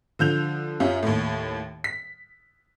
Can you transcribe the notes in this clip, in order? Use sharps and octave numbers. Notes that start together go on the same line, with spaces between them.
D3 F3 G6 F7
F#2 C#4 F4 G4
D#2 A2
B6